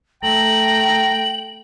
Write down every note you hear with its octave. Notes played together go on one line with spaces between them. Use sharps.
A3 G5 A#5 F#7